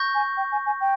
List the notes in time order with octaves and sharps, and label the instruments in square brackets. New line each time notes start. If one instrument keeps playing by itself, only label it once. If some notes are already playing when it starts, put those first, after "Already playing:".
Already playing: [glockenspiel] C#6 G6 A#6
[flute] G#5
G5
G#5
G#5
G5